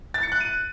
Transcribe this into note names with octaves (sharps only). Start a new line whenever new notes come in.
A6
C#7
F#6
D#7